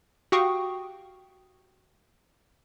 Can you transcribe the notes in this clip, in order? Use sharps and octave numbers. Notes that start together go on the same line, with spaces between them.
F#4 G4 F5 G5 C#6 D#6